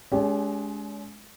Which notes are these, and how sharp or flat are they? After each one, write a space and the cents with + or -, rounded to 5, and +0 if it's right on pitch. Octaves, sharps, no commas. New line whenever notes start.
G#3 +20 C#4 +45 G4 +0